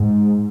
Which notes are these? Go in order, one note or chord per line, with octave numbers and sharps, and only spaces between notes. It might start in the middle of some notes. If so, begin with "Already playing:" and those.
Already playing: G#2